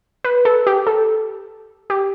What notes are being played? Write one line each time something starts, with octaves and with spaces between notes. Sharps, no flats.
B4
A4
G4
A4
G4